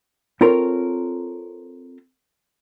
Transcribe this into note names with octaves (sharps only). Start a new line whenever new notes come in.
C4 F4 A4 A#4 C5 C#5